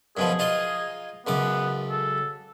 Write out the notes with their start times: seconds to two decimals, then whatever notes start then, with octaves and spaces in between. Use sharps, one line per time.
0.17 F#2 B2 F3 G#4
0.39 D#4 F4 D#5
1.27 C#2 F#2 B3 D6
1.91 A4